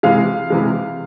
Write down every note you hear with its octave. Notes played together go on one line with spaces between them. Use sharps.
C3 E3 G#3 F5
C3 E3 G#3